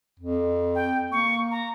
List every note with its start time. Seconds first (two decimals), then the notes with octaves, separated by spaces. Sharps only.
0.19 F2
0.75 G5
1.12 A#3 C#6
1.51 A#5